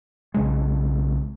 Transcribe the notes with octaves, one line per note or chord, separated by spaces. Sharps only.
B1 C#3 G#3